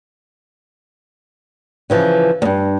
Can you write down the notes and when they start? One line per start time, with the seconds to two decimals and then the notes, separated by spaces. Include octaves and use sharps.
1.90 C#3 E3 F3
2.42 E2 G2